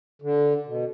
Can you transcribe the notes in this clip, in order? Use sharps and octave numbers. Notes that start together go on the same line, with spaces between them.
D3
B2